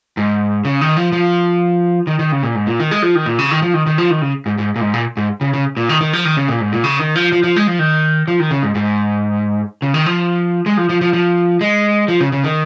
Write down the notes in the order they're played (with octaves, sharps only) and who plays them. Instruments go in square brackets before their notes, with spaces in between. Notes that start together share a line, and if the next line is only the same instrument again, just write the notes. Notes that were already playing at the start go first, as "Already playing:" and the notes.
[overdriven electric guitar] G#2
C#3
D#3
F3
F3
D#3
D#3
C#3
A#2
G#2
A#2
D#3
G#3
F3
D#3
A#2
C#3
D#3
F3
D#3
D#3
F3
D#3
C#3
G#2
G#2
A#2
G#2
A#2
G#2
C#3
C#3
A#2
D#3
D#3
F3
D#3
C#3
A#2
G#2
A#2
C#3
D#3
F3
F3
F3
G#3
F3
D#3
F3
D#3
C#3
G#2
G#2
C#3
D#3
F3
G#3
F3
F3
F3
F3
G#3
F3
C#3
C#3
D#3